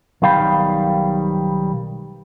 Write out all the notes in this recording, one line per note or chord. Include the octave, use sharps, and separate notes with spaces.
B1 D#3 G3 F5 G5 B5